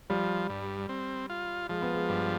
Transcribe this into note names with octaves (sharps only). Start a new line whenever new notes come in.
F3 G3
G2
C4
F4
F3 G#3
B3
G#3
G2